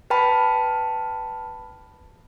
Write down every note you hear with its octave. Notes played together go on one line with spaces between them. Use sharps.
B4 G5 A5 B5